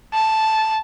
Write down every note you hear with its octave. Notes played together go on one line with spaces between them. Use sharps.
A5